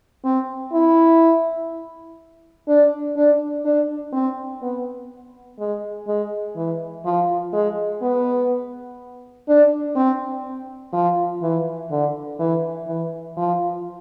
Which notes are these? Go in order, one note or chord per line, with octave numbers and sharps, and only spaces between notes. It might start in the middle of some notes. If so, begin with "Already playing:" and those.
C4
E4
D4
D4
D4
C4
B3
G#3
G#3
E3
F3
G#3
B3
D4
C4
F3
E3
D3
E3
E3
F3